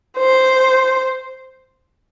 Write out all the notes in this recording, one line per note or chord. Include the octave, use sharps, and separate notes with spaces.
C5